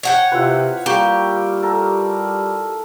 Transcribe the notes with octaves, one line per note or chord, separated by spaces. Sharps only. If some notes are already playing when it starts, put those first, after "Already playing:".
C#5 F#5 G5
C3 E4 F4 B4
G3 A#3 G4 G5 C#6
A4 A#4